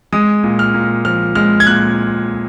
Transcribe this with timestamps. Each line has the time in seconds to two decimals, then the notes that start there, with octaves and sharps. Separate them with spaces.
0.13 G#3 D#6
0.43 A#2
0.59 F6
0.74 A#2
1.05 F3 F6
1.35 G#3 F6
1.60 G#6
1.67 A#2 F#6